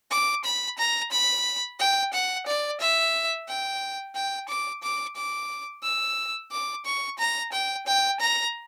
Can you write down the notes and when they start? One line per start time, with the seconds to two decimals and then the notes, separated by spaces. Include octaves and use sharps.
0.11 D6
0.44 B5
0.78 A#5
1.11 B5
1.79 G5
2.13 F#5
2.46 D5
2.80 E5
3.48 G5
4.15 G5
4.48 D6
4.83 D6
5.16 D6
5.83 E6
6.51 D6
6.85 C#6
7.18 A#5
7.52 G5
7.86 G5
8.20 A#5